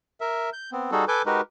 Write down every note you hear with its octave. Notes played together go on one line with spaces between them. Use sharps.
A#4 E5
G6
B3 C4
G3 D#4 F#4 G#4 A4
A4 B4 G#5 D6 G6
G#3 D#4 F#4 G4 A#4 B4